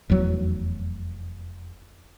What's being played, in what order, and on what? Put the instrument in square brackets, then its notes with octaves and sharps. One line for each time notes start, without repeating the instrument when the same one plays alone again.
[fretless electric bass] F1 E2 F#3